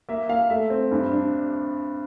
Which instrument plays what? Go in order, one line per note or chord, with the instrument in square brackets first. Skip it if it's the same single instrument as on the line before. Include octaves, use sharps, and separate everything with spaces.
[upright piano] A#3 E5
A#3 F5
A3 E5
C4
G2
D4